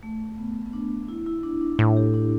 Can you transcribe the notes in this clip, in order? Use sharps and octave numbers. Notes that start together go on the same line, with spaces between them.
A3
B3
B3
D4
E4
E4
D4
D4
A2 D4
G4
D4